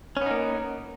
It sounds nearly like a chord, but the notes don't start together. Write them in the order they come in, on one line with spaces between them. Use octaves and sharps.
C#4 B3 D#4 A#3